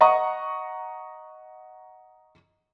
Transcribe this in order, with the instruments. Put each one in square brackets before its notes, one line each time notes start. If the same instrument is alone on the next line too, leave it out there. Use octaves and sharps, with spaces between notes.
[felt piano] D#5 F#5 A#5 C#6 D#6